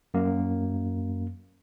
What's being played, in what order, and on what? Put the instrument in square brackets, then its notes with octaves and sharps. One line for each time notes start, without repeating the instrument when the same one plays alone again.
[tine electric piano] F#2 A#3